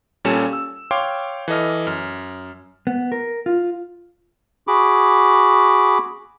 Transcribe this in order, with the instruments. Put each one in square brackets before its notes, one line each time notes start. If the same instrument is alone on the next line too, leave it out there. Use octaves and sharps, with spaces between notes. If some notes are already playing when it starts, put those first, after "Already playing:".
[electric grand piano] A#2 G3 C#4 A4 E7
E6
C#5 F5 G5 C6 D6
E3 A4 D#5 F6
F#2 F6
[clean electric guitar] B3
A#4
F4
[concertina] F#4 G#4 B5 D6